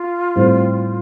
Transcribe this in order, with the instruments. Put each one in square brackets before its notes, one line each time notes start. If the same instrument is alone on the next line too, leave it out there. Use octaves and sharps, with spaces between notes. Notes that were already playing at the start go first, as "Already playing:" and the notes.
Already playing: [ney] F4
[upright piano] A2 G3 C4